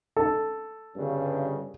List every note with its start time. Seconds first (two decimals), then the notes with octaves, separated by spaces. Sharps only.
0.16 A4
0.96 G1 G2 C#3